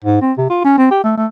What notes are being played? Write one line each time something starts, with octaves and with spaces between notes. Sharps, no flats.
G#2
C4
C3
F4
C#4
C4
G4
A3
A3